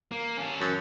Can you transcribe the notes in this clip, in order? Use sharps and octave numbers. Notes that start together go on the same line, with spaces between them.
A#3
C#4 A4
F#2